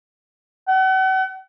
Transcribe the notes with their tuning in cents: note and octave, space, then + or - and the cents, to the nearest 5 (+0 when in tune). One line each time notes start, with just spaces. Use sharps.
F#5 +40